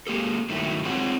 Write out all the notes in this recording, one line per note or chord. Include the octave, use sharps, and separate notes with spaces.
G#3 A#3 G4 A4
G2 D#3 F#3 A3 E4
G#3 C4 F4 G#4 C#5 F#5